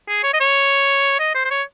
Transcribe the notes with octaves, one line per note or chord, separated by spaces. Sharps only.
G#4
C#5
D#5
C#5
D#5
C5
C5
C#5